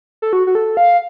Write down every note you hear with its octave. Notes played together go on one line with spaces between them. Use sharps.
A4
F#4
F#4
A4
F5